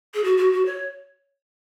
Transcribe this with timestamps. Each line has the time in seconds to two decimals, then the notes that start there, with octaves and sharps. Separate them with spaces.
0.14 G#4
0.24 F#4
0.38 F#4
0.53 F#4
0.66 C#5